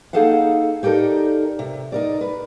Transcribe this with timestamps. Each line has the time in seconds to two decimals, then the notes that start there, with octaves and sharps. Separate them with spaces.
0.13 A#3 D#4 G#4 A4 F5 F#5
0.83 D#4 G4 A4 A#4 D5
1.59 C3
1.92 D#4 A#4 D5
2.21 B4